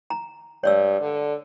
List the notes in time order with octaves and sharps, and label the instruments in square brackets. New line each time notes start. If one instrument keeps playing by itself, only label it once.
[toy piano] A#5
[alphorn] G2 [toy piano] C#5 D5 E6
[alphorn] D3